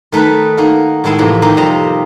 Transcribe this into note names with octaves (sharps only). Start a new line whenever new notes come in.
D#3 A3 D#4 A#4 B4
A#3 D#4 F#4 A#4
A2 D#3 G#3 E4 G#4
A2 C3 E3 F3 A#3
D#3 A#3 D#4 G4
F2 C3 F3 G3 D#5 A#5